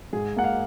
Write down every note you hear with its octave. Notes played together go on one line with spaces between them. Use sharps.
G#2 G#4
A#3 F#5
F5